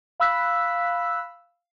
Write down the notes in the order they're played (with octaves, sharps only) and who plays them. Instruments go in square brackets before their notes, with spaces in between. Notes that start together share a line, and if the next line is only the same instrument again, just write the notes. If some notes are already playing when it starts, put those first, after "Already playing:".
[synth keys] F5 B5 E6 F#6 B6